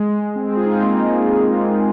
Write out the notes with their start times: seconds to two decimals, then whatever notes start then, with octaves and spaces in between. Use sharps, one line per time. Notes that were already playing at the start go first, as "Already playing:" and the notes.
Already playing: G#3
0.36 C4
0.49 G#4
0.56 F4
0.66 D#4
0.75 C4
0.83 A#3